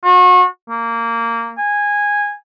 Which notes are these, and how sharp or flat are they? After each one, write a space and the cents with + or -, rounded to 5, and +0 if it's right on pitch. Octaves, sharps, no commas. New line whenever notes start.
F#4 -35
A#3 -15
G#5 -15